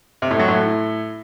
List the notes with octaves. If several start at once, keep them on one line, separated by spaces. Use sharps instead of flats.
C3
A2
F#3
A2